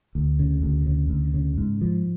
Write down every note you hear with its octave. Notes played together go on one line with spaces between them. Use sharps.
D2
C#3
D2
C#3
D2
C#3
G#2
F3